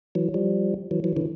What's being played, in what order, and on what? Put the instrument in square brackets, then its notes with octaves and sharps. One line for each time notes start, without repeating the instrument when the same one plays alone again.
[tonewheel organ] E3 F#3
F3 G3
E3 F#3
E3 F#3
D3 E3